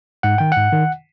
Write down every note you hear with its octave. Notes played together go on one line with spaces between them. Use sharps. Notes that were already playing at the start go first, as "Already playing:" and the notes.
G#2 F#5
D#3 G5
F#5
G#2
D#3